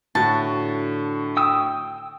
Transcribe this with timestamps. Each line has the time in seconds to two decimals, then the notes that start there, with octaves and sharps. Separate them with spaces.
0.15 A2 D3 F#4 A5
1.37 G5 D#6 E6